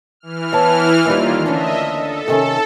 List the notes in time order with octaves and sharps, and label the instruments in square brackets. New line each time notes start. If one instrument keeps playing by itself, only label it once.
[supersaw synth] E3 F6
[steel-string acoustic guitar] B3 C#5 A5
[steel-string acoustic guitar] D#2 G3 [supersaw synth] D#3 A#3 F4
[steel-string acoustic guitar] D2 C#4 D4 [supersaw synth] D#5 E5
[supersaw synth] A4
[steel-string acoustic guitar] C3 D#3 C#4